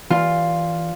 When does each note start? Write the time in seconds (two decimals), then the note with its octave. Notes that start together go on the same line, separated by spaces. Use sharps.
0.10 E3 F4 D5 G#5